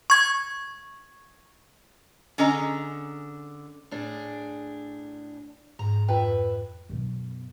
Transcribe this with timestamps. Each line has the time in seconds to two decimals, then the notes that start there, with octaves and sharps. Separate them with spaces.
0.10 C#6 G#6
2.38 D3 C#4 G#4 D#5 A#5
3.91 A2 D4 G#4
5.79 G#2 A#5
6.08 F2 B4 E5 G5
6.89 F#2 B2